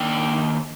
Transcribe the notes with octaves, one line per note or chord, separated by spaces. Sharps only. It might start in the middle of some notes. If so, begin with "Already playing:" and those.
Already playing: D#3 A#3 D4 G5